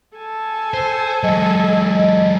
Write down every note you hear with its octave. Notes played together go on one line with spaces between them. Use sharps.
A4 G#5
C5
F#3 G#3 D#5